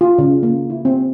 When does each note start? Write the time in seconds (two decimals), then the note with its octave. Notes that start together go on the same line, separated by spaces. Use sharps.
0.01 F4
0.19 C#3
0.43 A#3
0.70 E4
0.85 C4